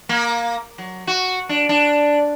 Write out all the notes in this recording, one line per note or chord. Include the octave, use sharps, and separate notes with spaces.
A#3
F#3
F#4
D4
D4